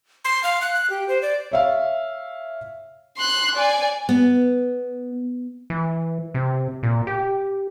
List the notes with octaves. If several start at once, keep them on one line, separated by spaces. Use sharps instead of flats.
C6
F5
F#6
F#6
G4
C5
D5
C#5 E5 F5
C6 F#6
D5 G#5
B3
E3
C3
A#2
G4